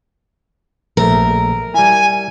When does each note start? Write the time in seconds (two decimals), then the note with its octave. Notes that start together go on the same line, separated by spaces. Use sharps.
0.97 A#1 A3 A#4
1.74 G3 E4 G#5